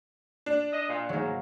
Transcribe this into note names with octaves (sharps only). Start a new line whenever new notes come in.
D4
D#5
A#2 F4
G#2 F#3 A#3